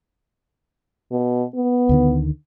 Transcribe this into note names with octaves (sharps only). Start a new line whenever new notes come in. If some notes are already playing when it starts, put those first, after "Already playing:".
B2
B3
D2 D3 D#3